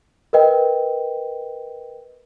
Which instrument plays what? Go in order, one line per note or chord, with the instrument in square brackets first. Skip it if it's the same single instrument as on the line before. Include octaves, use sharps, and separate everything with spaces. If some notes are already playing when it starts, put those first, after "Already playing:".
[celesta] A#4 B4 D#5 G5